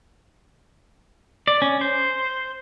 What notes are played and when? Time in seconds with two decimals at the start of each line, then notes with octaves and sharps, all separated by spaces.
1.47 D5
1.62 C#4
1.81 C5